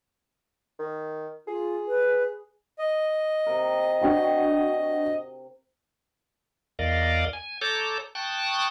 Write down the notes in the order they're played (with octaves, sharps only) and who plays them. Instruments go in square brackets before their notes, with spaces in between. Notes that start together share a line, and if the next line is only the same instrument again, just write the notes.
[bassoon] D#3
[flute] F4 [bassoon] G#4
[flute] B4
[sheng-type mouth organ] D#5
[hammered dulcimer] C3 A#4
[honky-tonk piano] D4 F#4 G5
[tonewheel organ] E2 A#4 D5 D#5 F5
G#5
A4 C#5 A5 A#5 D6 G6
G5 A5 C#6 D#6 F#6